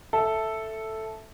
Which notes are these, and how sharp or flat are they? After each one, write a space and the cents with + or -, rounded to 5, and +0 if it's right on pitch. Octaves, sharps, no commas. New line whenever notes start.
A4 +0 E5 +0